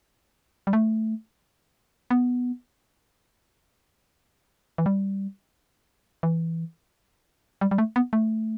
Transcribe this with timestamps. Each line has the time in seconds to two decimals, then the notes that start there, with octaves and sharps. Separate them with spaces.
0.67 G3
0.73 A3
2.11 B3
4.78 E3
4.86 G3
6.23 E3
7.61 G3
7.71 G3
7.78 A3
7.96 B3
8.13 A3